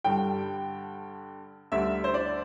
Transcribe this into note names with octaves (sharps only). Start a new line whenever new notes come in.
G2 D3 G3 G5
D2 D3 G3 E5
C5
D5